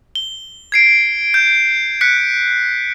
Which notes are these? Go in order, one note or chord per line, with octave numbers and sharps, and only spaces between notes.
G7
G#6 C7 D7
G6
F#6 B6 C#7